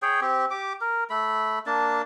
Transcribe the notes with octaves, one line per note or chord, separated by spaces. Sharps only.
G#4 C#5 G5
C4 G4
G4 D6
A#4
A3 B5
A#3 D4 A5